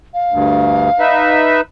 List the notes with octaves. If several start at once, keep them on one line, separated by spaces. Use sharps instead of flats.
F5
D2 G2
D#4 B4 E5